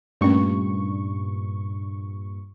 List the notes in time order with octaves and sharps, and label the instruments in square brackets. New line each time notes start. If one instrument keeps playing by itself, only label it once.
[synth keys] G2 A#2 C#6 [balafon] A3 C#4